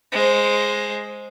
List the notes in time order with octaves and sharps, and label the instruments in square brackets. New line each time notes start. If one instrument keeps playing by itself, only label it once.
[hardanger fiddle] G#3 C5